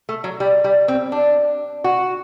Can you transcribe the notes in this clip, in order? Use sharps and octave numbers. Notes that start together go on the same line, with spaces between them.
A3
F#3
G3
G3
C4
D4
F#4